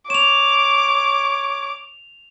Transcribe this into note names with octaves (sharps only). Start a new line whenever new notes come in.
C#5 D6 E7 F7